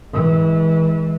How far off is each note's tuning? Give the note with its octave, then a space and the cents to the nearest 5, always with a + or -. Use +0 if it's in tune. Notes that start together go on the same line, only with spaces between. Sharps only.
E3 -30 G#3 +0